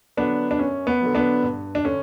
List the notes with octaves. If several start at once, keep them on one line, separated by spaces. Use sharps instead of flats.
D3 F#3 B3 D4
D4
F#2 C#4
B3
D3 F#3
B3 D4
G2
D4
D3 C#4